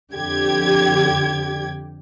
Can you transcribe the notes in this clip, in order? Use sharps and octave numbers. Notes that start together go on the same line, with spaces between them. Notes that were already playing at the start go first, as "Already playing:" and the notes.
F2 D3 G4 G5 G#6